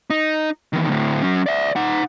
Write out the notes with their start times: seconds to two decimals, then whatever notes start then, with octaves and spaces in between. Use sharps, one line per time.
0.10 D#4
0.73 E2 D#3
0.88 D2 A2
1.22 F#3 C#4
1.46 D5 E5
1.76 D#4 F#5